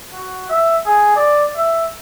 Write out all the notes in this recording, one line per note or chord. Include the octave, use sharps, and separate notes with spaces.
F#4
E5
G#4
D5
E5